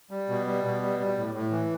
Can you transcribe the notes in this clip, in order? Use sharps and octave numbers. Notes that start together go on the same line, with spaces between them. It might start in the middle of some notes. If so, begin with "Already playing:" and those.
G3
B2
G3
B2
G3
G3
A2
A2
E3